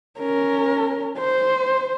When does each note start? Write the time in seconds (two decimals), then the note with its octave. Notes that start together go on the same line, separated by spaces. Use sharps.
0.19 C#4 A#4
1.18 C5